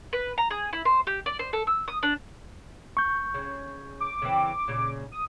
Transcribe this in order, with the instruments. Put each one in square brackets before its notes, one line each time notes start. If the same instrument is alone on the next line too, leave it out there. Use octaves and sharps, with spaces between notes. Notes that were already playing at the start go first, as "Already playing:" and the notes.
[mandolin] B4
A#5
G#4
E4
C5
G4
D5
C5
A4
E6
D#6
D4
[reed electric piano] C#6 G6
[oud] C#3
[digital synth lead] D6
[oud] C#3 E3 C4
A#2 C#3
[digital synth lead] D#6